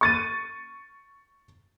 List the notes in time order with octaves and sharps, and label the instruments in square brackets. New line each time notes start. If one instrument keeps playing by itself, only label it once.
[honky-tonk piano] C#6 A6 D#7